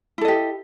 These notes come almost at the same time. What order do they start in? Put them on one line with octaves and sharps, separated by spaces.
E4 A4 D#5 G4